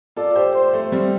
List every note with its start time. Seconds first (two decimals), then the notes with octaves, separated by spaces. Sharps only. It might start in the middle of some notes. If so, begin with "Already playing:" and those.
0.17 F4 A4 D5
0.35 G4 C5
0.55 C5
0.73 A3
0.92 G3 C4